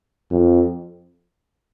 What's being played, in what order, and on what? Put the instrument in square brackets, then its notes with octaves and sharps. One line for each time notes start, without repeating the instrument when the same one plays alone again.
[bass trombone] F2